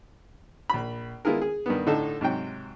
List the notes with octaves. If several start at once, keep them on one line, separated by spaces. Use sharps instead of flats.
A#1 B5
G#3 B3 E4 F4 G#4 A#4
G#4
G2 D#3 B3
A2 D3 A3 D#4 A4
G#2 C3 F#3 G5